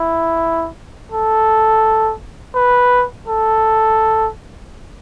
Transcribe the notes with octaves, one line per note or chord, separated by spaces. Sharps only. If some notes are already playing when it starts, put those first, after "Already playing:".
Already playing: E4
A4
B4
A4